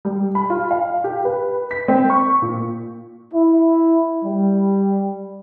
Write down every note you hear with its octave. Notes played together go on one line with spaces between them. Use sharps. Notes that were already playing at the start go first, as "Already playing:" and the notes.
G3
B5
F4
F5
G4
B4
B6
C4
C#6
A#2
E4
G3